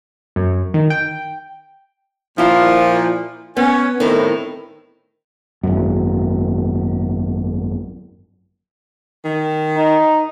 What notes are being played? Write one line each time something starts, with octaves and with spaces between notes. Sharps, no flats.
F#2
D#3
G5
A#2 F3 E4 F4
B3 C#4
A2 D#3 C4 E4
G#1 F#2
D#3
D#4